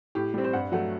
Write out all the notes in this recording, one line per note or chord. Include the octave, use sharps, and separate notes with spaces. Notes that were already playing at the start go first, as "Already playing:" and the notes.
A2 G4
G3 C4 G4
C5
G2 F#5
F#3 A3 F#5